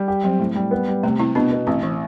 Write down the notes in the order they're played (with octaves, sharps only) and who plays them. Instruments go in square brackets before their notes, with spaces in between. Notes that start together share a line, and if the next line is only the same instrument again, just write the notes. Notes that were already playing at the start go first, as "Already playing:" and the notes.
Already playing: [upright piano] G3
G4
[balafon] F#3 [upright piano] C4
[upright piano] A2
G3
B3
G3
[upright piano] C3 [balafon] A3
[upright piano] C3 [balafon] C4 E4
[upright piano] B2 [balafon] B3 D4
[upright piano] B2
[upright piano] A1 [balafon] C4
[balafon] E3